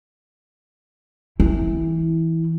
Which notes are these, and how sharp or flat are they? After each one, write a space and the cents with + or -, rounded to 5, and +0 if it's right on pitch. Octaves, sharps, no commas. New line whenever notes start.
E3 -15 E4 +0